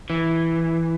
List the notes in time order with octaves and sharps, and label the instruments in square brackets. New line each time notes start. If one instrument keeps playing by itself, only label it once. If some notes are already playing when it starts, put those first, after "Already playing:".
[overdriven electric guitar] E3